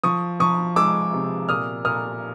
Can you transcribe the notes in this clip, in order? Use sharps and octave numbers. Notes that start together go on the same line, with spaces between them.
F3 C#6 D#6
F3 C#6 D#6
G#3 D6 E6
C3
A#2 D#6 F6
A#2 D#6 F6